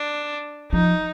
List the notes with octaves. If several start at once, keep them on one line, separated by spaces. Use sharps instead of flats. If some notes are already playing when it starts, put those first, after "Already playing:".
Already playing: D4
F3 D#4